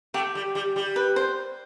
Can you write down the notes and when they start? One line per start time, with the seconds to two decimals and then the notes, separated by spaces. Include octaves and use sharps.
0.14 A3 G4
0.35 G3
0.55 G3
0.76 G3
0.96 B4
1.16 C5